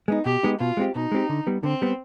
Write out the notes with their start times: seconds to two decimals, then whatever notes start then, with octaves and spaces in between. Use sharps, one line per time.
0.08 G#3 B3 D#4
0.25 B2 G4
0.43 G#3 B3 D#4
0.60 B2 F4
0.77 G#3 C4 G4
0.95 B2 D#4
1.12 G#3 C4 G4
1.29 D3
1.47 G3 B3
1.63 D3 C4
1.82 G3 B3